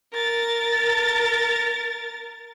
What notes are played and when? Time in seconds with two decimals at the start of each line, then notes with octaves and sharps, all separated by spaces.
0.13 A#4 A6